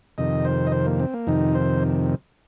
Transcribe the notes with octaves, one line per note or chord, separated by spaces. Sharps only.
F2 C3 D#3 D#5
C5
D#5
C5
A#3
C4
A#3
F2 C3 D#3 D#4
C5